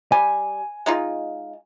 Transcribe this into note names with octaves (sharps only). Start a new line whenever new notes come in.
G3 G#5
G#3 D#4 F4